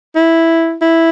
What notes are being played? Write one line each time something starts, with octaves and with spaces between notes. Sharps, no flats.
E4
E4